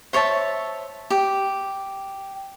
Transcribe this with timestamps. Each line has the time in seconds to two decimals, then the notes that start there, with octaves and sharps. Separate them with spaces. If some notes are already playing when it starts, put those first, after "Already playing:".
0.13 C5 C#5 E5 A5
1.10 G4